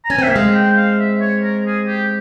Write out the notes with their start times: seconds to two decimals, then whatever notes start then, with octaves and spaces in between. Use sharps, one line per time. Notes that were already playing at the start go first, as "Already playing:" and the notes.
0.05 A#5
0.10 C#4 G#5
0.18 C4
0.23 A#3 E5
0.33 G#3 C4 F5
0.55 G5
0.76 F5
0.99 E5
1.21 C#5
1.43 A#4
1.65 G#4
1.87 G4